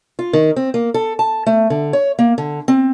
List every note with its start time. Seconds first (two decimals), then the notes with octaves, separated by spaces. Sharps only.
0.19 F4
0.33 D#3
0.56 C4
0.74 A#3
0.94 A4
1.19 A5
1.46 A3
1.70 D3
1.93 C#5
2.19 A#3
2.38 D3
2.68 C4